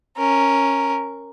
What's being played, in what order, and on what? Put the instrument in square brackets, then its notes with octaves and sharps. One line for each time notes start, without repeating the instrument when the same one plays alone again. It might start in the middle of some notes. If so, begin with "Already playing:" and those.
[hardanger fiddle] C#4 A#4